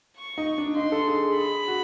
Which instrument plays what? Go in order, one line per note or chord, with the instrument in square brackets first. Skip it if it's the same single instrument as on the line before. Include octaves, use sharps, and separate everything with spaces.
[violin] C#6
[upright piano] D#4
D4
[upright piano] D#4 [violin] C6
[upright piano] A4
G#4
G#4
[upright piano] G#4 [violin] B5
[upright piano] F#4